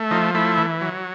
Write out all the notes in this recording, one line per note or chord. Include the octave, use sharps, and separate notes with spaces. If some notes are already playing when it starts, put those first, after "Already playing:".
Already playing: A3
F3 D#4
A3 E4
E3
F#3